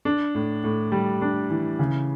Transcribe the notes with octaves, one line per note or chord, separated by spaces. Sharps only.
D4
A2
A2
G3
D4
E3
C#3